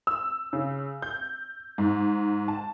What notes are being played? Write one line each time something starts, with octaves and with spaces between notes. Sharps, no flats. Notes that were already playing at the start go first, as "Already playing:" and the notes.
E6
C#3
G6
G#2
A5